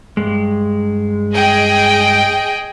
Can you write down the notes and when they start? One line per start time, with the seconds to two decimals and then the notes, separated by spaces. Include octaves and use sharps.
0.17 G2 G#3
1.35 G#4 D#5 G5